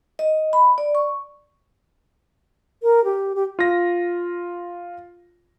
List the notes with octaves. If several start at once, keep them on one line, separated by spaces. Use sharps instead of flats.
D#5
B5
D5
C#6
A#4
G4
G4
F4 A#6